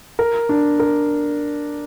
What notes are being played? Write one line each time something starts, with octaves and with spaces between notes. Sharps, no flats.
A#4
D4
A#4